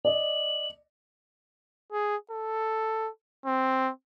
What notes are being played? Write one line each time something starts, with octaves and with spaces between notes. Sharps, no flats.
D5 D#5 F#7
G#4
A4
C4